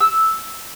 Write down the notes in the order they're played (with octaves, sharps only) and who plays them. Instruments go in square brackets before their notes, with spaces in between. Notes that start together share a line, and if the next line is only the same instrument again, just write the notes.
[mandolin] E6